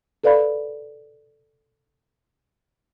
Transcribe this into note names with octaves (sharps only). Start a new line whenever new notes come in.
A4 B4 D5 F5 B5